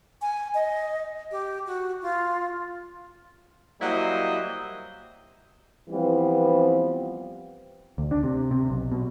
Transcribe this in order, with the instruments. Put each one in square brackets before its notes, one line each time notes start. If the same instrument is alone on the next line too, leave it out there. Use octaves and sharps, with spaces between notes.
[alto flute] G#5
D#5
G4
F#4
F4
[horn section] F#3 G3 A#3 E4 C5 D#5
[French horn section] E3 F3 G3 B3 C4
[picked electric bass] D2
D4
C3
C3
B1
B2